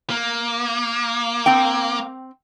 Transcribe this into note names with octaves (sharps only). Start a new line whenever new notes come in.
A#3
C4 G5